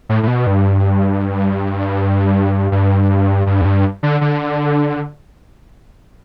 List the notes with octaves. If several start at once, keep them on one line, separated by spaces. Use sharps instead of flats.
A2
A2
B2
G2
G2
G2
E2
G2
D3
D3